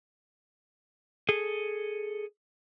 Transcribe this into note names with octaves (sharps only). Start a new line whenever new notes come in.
G#4 A4